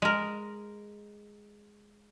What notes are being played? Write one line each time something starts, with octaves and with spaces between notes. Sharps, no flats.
G#3 A#4